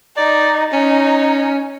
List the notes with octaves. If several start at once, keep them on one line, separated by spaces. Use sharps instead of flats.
D#4 D5
C#4 D#4